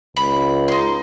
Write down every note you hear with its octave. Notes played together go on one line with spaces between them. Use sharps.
C#2 B5
D#4 C6